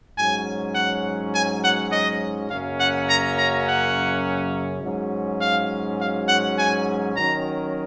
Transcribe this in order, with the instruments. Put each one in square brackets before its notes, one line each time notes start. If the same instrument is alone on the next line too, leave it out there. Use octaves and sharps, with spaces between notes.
[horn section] G#2 F#3 C#4 G#5
F#5
G#5
F#5
D#5
F#2 C#3 F#3 A#3 C#4 F5
F#5
A#5
A#5
F#5
G#2 F#3 C#4
F5
F5
F#5
G#5
D#3 F#3 C#4 A#5